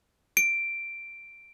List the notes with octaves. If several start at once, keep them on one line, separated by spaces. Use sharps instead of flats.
D7